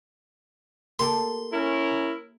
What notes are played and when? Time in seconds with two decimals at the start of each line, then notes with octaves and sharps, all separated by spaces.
0.99 A#3 G4 A4 C6
1.52 C#4 E4 A#4